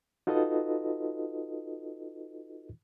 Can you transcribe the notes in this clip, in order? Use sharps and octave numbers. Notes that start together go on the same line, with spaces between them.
D#4 F4 F#4 A4 B4 D#5